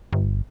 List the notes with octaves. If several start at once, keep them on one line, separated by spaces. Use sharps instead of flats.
G1